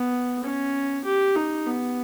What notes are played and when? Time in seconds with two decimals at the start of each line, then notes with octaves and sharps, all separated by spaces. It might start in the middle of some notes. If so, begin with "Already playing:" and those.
Already playing: B3
0.44 C#4
1.05 G4
1.36 D#4
1.66 B3